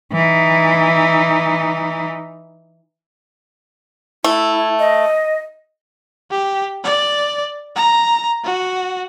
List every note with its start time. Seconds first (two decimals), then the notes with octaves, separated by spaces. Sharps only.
0.13 E3 D#4
4.24 A3 E4
4.79 D#5
6.31 G4
6.84 D5
7.76 A#5
8.44 F#4